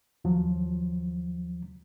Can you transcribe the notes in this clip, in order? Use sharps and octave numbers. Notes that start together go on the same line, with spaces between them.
D#2 F3 F#3